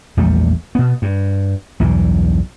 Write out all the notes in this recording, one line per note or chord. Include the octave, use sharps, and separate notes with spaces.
A#1 E2 G3 A3
B2 B3
G2
B1 E2 G2